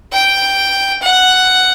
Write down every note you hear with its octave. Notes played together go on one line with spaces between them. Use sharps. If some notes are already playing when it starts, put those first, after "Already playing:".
G5
F#5